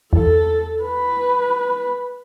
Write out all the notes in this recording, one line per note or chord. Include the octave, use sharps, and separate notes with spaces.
E2 A4
B4